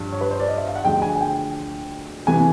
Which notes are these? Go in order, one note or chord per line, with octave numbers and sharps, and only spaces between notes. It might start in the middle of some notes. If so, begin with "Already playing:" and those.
Already playing: G2 D3 F3
C#5
B4
C5
D5
D#5
E5
F5
F#5
D2 D3 F3 G#3 G5
G#5
G5
C3 E3 A3 G#5